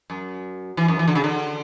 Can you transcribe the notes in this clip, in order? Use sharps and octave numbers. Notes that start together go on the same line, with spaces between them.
F#2
E3
F#2
E3
D3
C#3
D3